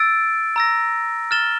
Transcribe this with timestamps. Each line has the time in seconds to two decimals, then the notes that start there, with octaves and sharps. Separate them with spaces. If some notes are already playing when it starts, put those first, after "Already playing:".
Already playing: E6 A6 D7
0.56 A#5 E6 A#6
1.31 F6 A6 E7 G7